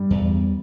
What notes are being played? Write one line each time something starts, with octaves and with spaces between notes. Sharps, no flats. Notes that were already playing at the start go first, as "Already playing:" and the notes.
Already playing: G2 G3
E2